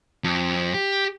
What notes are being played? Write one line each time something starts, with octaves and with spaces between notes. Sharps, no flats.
F2
G4